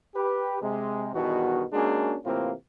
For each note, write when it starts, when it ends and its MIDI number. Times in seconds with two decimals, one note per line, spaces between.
0.15 0.59 67
0.15 0.59 71
0.62 1.09 48
0.62 1.09 56
1.14 1.64 40
1.14 1.64 43
1.14 1.64 47
1.14 1.64 51
1.14 1.64 66
1.73 2.16 56
1.73 2.16 58
1.73 2.16 61
1.73 2.16 62
1.73 2.16 66
1.73 2.16 68
2.25 2.52 45
2.25 2.52 48
2.25 2.52 52
2.25 2.52 58
2.25 2.52 60
2.25 2.52 65